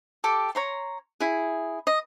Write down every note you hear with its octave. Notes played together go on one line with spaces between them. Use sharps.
G4 A4 D6
C#5 A#5 C6
E4 G#4
D#5